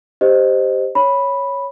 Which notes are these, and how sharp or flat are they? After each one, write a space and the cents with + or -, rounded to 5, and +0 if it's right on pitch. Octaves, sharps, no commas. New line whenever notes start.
G4 +0 C5 +0 D#5 -10
C#5 +0 B5 -5